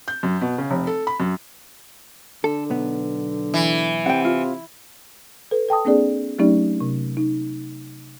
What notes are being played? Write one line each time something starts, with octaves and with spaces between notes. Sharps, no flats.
G6
F#2
B2
C#3
F1
A4
B5
F#2
D3 A4
B1 B3
E3
C3 F#5 G5
F4
A4 B4
A4 G5 A5 D#6
A#3 C4 D4 G#4 D5
F#3 A3 C#4 D#4 G4 D5
C3
D#4